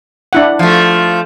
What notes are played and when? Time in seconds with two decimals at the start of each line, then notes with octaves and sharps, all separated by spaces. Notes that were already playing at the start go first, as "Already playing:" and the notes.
0.33 D4 E4 F#5
0.59 F3 A3